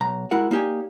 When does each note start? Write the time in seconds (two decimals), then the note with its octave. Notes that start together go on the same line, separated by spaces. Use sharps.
0.01 B1 A#5
0.31 G#3 E4 F#4 A#4 F#5
0.51 A#3 D#4 G4 D5 G#5